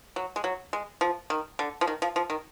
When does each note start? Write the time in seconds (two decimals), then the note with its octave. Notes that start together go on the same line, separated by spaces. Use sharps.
0.16 F#3
0.36 G#3
0.44 F#3
0.73 G#3
1.01 F3
1.30 D#3
1.59 D3
1.81 F3
1.87 D#3
2.02 F3
2.16 F3
2.30 D#3